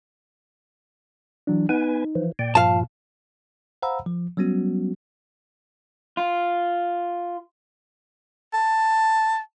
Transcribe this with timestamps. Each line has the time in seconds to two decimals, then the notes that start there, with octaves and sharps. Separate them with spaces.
1.47 E3 F#3 D4
1.69 B3 D#4 B4 G#5
2.15 E3 F3
2.39 A#2 D5 G5
2.55 G2 F3 F4 F5 A5
3.82 C5 F5 F#5 A#5 B5 E6
4.06 F3
4.37 F#3 G3 B3 C#4 F#4
6.17 F4
8.53 A5